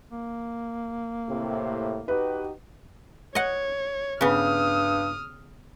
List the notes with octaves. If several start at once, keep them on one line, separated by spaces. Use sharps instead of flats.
A#3
A2 C3
D#4 F#4 G4 B4
C#5 D#5 F#5
G2 C#3 B3 D#6 F6